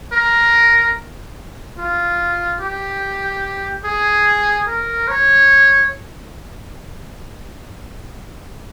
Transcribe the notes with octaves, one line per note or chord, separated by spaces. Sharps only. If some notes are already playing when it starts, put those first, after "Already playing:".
A#4
F4
G4
G#4
A#4
C#5